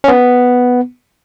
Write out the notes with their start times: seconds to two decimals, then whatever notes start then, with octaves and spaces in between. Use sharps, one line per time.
0.04 C#4
0.08 B3